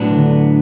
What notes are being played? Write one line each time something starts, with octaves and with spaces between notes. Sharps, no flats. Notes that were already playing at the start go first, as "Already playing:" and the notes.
Already playing: A2 F#3 B3 D4
D3